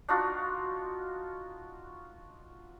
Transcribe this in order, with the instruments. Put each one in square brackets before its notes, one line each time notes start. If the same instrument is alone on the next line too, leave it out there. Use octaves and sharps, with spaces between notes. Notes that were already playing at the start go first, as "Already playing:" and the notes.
[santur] D4 D#4 F4 F#4